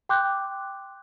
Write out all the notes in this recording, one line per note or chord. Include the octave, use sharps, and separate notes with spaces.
G5 C6 D6 F#6 G6